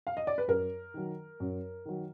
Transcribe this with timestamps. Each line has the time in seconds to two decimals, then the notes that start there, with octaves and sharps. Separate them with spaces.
0.07 F5
0.17 D#5
0.27 D5
0.38 B4
0.48 F#2 A#4
0.94 D#3 F#3
1.40 F#2
1.86 D#3 F#3